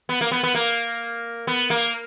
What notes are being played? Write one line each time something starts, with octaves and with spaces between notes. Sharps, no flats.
B3
A#3
B3
B3
A#3
B3
A#3